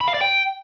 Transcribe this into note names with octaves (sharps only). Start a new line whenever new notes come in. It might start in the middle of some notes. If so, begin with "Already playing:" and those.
B5
F5
D5
G5